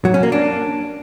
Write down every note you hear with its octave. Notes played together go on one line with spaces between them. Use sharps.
F#3
C#4
A#3
D4